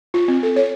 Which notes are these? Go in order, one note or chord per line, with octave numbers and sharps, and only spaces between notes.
F4
C4
A4
C#5